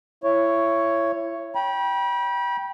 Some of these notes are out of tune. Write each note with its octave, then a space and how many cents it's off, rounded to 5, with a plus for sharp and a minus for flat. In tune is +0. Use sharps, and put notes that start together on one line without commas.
E4 +25 C#5 +0
G5 +0 B5 -35